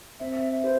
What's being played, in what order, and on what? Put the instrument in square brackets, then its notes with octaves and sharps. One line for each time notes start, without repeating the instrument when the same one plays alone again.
[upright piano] C4 [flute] E5
[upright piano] G4 B4 [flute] C5